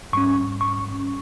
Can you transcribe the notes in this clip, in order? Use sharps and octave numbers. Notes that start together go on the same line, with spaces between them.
G#2 G3 C#4 C#6
C#6